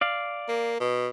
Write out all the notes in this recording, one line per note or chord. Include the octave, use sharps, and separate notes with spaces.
D5 F5
A#3
B2